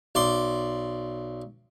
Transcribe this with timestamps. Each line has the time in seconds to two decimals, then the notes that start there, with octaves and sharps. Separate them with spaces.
0.15 B1 D5 C6